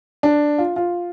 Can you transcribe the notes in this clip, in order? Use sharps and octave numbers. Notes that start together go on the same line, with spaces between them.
D4
F4
F4